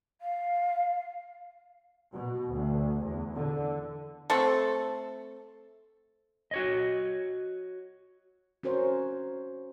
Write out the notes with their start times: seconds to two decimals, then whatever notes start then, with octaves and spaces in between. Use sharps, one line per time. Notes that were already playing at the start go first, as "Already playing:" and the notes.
0.21 F5
2.14 B2
2.52 D2
3.03 E2
3.36 D3
4.30 A3 C4 A4
6.51 F#4 C#5 D#5
8.63 C#4 F#4 A#4 C5 C#5